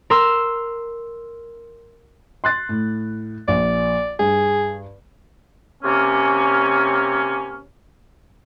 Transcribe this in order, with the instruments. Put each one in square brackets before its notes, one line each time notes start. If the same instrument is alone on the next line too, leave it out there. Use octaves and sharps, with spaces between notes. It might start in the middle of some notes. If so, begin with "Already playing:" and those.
[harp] A#4 C6 E6
[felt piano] C6 F#6 A6
A2
[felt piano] A#1 [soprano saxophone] D5
[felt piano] G2 [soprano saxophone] G#4
[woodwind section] C3 A#3 C#4